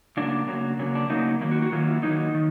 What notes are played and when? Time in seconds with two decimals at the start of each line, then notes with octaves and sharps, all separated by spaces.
0.17 C#3 F#3 A#3 D4
0.47 C#3 F#3 A#3
0.79 C#3 F#3 A#3
0.95 D4
1.10 C#3 F#3 A#3 D#4
1.41 D#3 F#3 A#3
1.51 F#4
1.62 F#4
1.72 D#3 F#3 A#3 F4
1.88 E4
2.03 D#3 F#3 A#3 D#4
2.35 D#3